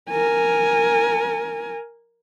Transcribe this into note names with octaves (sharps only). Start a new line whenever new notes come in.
A#4 G#5